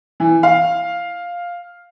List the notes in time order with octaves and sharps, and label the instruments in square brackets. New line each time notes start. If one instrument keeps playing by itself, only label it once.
[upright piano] E3
F5